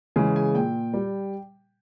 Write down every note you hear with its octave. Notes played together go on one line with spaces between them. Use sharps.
C#3 E3 G#3 G#5
G#5
A#2 G5
G3